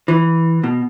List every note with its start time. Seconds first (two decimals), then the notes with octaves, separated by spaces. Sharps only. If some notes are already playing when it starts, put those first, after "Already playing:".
0.08 E3
0.64 B2